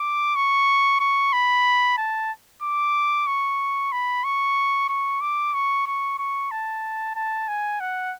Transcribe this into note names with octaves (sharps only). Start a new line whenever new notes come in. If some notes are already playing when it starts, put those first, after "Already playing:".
Already playing: D6
C#6
C#6
B5
A5
D6
C#6
B5
C#6
C#6
D6
C#6
C#6
C#6
A5
A5
G#5
F#5